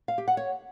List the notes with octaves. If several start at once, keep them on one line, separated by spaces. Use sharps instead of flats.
F5
G4
F#5
C#5